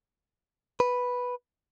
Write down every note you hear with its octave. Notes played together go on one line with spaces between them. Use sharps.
B4